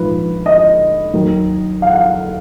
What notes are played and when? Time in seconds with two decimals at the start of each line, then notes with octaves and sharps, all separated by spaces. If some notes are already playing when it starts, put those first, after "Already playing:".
Already playing: A#1 G#2 F3 B4
0.46 D#5
1.14 D#2 D#3 F#3
1.82 F5
1.90 F#5
1.97 F5